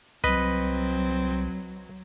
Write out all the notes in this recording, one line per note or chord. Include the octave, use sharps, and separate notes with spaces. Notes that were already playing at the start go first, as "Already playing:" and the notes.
C2 F#3 C4 B4 D#5